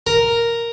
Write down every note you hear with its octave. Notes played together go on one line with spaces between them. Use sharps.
A#4